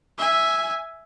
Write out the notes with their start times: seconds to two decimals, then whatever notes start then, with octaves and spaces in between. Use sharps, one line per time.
0.18 E5 G#5